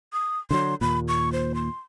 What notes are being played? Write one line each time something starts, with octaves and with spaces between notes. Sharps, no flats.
D#6
D3 F3 F#3 C6
D#2 A#2 B5
C#6
C5
C6